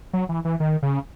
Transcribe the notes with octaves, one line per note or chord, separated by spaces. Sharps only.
F#3
E3
E3
D#3
C#3